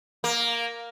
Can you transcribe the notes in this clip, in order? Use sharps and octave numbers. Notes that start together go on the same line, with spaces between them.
A#3